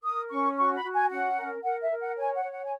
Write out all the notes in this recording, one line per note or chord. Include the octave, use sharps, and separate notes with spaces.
A#4 D#6
C#4 C#6
F#4 C#6
B5
F#4
G#5
C#4 F#5
A#4
A#4 F#5
E5
A#4
F#5
C#5 G#5
F#5
C#5
F#5
G#5